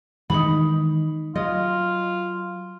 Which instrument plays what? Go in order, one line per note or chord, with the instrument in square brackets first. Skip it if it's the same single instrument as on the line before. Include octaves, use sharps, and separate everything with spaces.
[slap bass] D#3 E3 G#3 [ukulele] D#4 B5
[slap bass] F#3 [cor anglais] F4 [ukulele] D#5